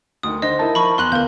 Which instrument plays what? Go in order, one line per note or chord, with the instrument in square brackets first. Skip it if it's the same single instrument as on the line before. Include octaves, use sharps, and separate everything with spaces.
[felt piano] D2 D#3 [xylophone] D#6
[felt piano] D3 C5 A#6 [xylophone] D#5
[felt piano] D#4 E5 [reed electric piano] E4 A#4 A5
[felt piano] F3 [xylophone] B5 C#6
[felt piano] E2 [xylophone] C6 F#6 F#7
[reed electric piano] D2 B3 F5 [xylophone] A#4 G6